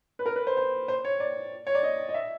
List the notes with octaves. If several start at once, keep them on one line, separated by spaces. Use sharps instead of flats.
B4
A#4
B4
C5
C5
C5
C#5
D5
C#5
D5
D#5
D#5
E5